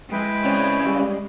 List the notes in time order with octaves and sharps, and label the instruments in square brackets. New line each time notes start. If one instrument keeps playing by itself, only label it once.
[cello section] G#3 [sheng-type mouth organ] E4 B4 G5
[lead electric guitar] C#3 [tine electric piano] C4 D5
[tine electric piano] G3